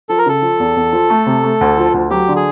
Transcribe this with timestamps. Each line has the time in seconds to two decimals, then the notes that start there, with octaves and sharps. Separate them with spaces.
0.09 F3 A4
0.18 A#4
0.26 C#3 A4
0.42 F3
0.59 E2
0.76 E2
0.93 F3
1.10 A3
1.26 C3
1.43 A3
1.61 D2
1.78 F3
1.94 D2
2.10 F#3 G4
2.28 D3
2.36 G#4